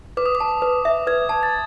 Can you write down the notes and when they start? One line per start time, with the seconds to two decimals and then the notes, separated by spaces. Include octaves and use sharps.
0.17 B4 D6
0.26 D#6
0.35 D6
0.40 A5
0.62 B4
0.85 E5
1.07 B4 G#6
1.29 A5
1.43 A6